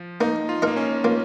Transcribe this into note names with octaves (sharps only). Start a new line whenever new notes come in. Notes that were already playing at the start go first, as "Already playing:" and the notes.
Already playing: F3
A#3 D#4
F4
A#3 D#4 A#4 D#5
C#4
A#3 F4